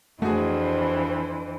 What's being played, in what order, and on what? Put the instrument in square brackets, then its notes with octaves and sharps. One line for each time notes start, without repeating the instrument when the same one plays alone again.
[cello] F2 E3 [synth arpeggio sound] A3 [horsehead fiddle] D4 C5 [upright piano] F#4 G#4